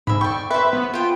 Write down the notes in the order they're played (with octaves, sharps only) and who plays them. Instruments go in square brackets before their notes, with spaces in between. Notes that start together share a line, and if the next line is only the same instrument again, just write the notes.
[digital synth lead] G#2 [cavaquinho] E5 B5
[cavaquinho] D5 G5 [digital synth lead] C#6
[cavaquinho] B4 C5 [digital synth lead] E5
[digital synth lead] B3
[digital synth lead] F4 [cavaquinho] C5 G5